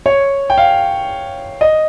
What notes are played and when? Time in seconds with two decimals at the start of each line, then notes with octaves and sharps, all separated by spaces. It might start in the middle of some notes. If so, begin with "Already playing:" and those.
0.06 C#5
0.50 G5
0.58 F5
1.61 D#5